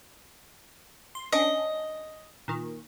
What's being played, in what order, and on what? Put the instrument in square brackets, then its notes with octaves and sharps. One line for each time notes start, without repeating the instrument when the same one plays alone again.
[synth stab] C6
[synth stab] C#4 D4 [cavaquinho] D#5
[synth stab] A#2 D#3